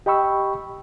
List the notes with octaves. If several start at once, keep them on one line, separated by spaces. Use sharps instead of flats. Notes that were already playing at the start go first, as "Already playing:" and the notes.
G4 D#5 G5 B5 C#6 E6